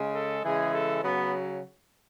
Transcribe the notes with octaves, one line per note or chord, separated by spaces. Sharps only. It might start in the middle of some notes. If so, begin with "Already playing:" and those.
Already playing: C#3 G#3
A4
C#3 E3 G#3 G#4
A4
C#3 F#3 B3